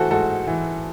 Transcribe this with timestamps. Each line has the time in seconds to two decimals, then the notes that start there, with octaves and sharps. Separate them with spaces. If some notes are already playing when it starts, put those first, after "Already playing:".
Already playing: E3 F#4 A4 C5
0.11 G#2 F#4 A4
0.47 E3